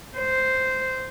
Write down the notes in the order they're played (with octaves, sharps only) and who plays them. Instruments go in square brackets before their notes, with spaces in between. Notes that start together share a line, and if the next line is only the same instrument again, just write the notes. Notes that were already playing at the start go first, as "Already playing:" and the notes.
[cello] C5